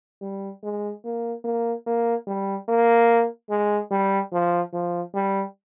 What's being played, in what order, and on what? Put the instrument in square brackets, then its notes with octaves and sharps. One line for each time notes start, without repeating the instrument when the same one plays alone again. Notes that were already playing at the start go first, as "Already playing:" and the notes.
[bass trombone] G3
G#3
A#3
A#3
A#3
G3
A#3
G#3
G3
F3
F3
G3